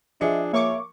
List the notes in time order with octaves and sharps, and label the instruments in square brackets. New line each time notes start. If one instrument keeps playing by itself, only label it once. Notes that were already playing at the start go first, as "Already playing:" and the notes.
[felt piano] F3 G#4 C#7 [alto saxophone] D4 [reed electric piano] D#5 E5
[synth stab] A#3 C#6 D6 [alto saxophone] C#5 [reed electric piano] E5